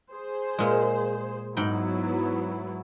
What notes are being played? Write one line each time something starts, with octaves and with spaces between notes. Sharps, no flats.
G#4 C5
A#2 G#3
G#2 F#3 B3 E4 G5 B5